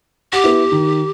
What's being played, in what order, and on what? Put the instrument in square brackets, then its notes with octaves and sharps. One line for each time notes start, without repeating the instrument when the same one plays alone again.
[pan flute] G4 [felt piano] F#5
[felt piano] B3 E4
D#3